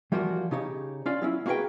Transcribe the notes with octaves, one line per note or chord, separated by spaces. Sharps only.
E3 F3 G3 A#3 F4 F#4
C#3 D#4 G4 C#5
C#4 F4 D5
F#3 C#4 E4
A#3 F#4 G#4 B4 G5